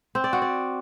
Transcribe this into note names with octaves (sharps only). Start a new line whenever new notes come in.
C4
D5
F#4
D5